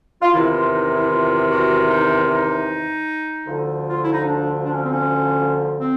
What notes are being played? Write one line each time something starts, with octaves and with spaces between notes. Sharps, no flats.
F4
E2 C3 D#3 E4
F4
D#4
E4
F4
F#4
D#4
D#4
D2 D3 F3
F4
E4
D#4
D4
D4
C#4
C4
C#4
C4